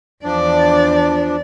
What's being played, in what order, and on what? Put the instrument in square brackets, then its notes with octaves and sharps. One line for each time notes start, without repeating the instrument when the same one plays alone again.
[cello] E2 D5 [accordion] F3 D4